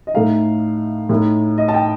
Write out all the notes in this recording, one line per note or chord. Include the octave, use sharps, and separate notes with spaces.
D#5
A2 A3 D#4 F5
A2 A3 D#4
D#5
A5
G5